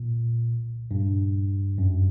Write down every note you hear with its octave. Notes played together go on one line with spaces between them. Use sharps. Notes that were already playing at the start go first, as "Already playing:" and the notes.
Already playing: A#2
G2
F#2